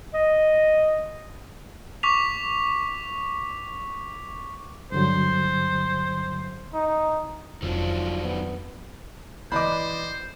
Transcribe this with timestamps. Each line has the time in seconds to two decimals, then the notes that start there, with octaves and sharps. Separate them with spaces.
0.14 D#5
2.03 C#6 D6 B6 F7
4.92 G2 D3 F#3 C5
6.74 D#4
7.62 F1 D#3 F3 F#3 D4
8.24 B3
9.52 E3 C5 D5 D#5 B5 D6